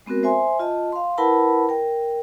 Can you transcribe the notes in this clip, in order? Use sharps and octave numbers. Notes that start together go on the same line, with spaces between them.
G#3 B3 C4 F#4 A#4
C5 E5 G#5 C6
F4 D#5 A5
F5 C6
E4 A#4 B4 F#5 A5 B5
A#4 G5